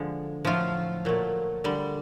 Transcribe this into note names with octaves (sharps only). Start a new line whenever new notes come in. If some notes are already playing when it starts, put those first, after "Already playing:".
Already playing: D3 F3 G#3
A2 F3 F#3 A3 F4
A#2 F#3 A3
D3 G3